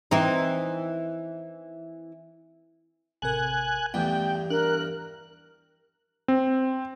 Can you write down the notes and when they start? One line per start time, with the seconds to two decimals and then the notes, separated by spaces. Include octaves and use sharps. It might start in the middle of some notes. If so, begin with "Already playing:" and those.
0.11 E3 C4 D#4
3.22 A1 C3 A#4 G#5 F#6
3.94 E2 G2 A3 B3 G5
4.50 D4 A#4 F#6
6.28 C4